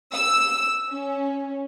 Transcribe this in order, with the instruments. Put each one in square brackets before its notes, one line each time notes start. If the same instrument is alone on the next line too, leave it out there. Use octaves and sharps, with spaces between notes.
[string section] E6
C#4